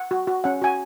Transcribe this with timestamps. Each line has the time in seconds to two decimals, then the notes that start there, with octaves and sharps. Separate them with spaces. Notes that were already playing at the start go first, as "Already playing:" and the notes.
Already playing: F#5
0.11 F#4
0.27 F#4
0.44 C#4 F#5
0.62 F#4 G#5